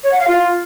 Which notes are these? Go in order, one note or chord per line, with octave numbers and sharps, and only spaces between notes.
C#5
F#5
F5
F4